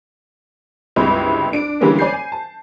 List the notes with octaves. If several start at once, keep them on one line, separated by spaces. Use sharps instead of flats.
G1 C#2 G2 G#3 C4 E4
D4 D7
D3 E3 G3 G#3 A#3 C#4
C#5 D5 G#5 G6 C7
G#5
A5